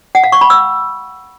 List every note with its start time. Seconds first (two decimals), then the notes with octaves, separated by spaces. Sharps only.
0.15 F#5
0.24 F5
0.32 C#6
0.41 B5
0.50 E6